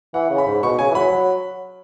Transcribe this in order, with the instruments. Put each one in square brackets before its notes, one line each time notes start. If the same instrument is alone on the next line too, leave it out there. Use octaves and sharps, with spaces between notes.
[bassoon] E3 [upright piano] F#5
[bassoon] C#3
[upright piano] B5
[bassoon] G#2
[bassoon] B2 [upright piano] C#6
[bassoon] C#3 [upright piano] G#5
[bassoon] E3
[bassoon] F#3 [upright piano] B5
[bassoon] F#3